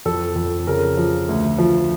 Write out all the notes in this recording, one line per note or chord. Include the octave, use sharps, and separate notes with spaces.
F2 A4
F2
C#3 A#4
F3
D2
F3